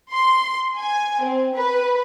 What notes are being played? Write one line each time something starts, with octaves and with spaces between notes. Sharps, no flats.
C6
G#5
C4
B4